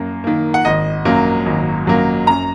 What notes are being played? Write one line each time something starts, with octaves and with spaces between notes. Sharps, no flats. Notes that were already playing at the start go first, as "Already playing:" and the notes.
Already playing: F#2 A#3
D#3 A#3
F#5
G#1 D#5
F#2 F#3 A#3
G#1
F#2 F#3 A#3
F#2 A#5